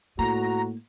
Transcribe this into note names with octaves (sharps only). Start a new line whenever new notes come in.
A2 A#3 F#4 A#5